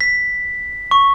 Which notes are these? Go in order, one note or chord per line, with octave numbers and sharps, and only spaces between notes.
B6
C#6